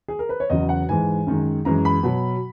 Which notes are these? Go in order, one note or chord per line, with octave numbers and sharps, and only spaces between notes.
G#4
A#4
B4
C#5
E2 C#3 F#3 D#5
F#5
G#2 E3 G#3 G#5
F#2 D#3 G#3
F#2 E3 G#3 A#5
B5
B2 F#3